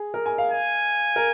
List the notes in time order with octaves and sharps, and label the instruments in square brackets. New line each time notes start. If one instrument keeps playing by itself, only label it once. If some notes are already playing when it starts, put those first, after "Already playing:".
Already playing: [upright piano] G#4
A#4
G#5
F5
[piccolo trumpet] G#5
[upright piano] A#4